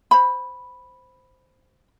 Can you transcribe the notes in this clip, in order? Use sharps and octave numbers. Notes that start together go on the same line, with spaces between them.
C5 B5